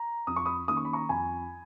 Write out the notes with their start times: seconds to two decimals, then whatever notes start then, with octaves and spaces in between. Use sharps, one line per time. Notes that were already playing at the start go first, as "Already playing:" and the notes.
Already playing: A#5
0.27 F2 D#6
0.36 C#6
0.46 B5 D#6
0.68 D#3 A#3 C#4 D#6
0.77 C#6
0.85 B5
0.93 A#5 C#6
1.09 F2 G#5 B5